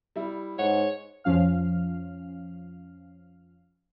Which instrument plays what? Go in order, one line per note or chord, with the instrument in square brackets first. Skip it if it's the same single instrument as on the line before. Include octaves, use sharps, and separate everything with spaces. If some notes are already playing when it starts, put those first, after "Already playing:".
[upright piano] G3 E4
[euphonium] G#2 [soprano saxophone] C#5 [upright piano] F#5
[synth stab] F2 F3 C#4 F5 F6